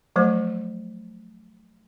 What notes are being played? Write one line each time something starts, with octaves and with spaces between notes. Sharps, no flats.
F3 F#3 A3 C5